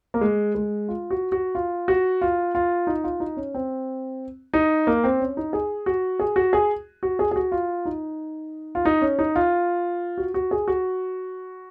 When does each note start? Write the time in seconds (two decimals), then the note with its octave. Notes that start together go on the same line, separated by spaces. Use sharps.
0.14 A#3
0.21 G#3
0.55 G#3
0.88 F4
1.11 F#4
1.32 F#4
1.55 F4
1.88 F#4
2.22 F4
2.55 F4
2.87 D#4
3.04 F4
3.20 D#4
3.37 C#4
3.54 C4
4.54 D#4
4.87 A#3
5.04 C4
5.20 C#4
5.37 D#4
5.53 G#4
5.86 F#4
6.20 G#4
6.36 F#4
6.53 G#4
7.03 F#4
7.19 G#4
7.31 G#4
7.36 F#4
7.52 F4
7.85 D#4
8.75 F4
8.85 D#4
9.02 C#4
9.19 D#4
9.36 F4
10.18 F#4
10.34 F#4
10.51 G#4
10.68 F#4